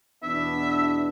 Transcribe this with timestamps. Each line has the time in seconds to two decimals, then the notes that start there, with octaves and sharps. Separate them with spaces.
0.23 E2 B2 B3 D4 E5